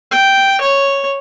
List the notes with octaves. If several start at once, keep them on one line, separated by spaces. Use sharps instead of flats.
G5
C#5